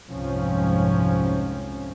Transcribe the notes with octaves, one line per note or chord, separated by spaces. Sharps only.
C2 F2 G#2 F3 C#4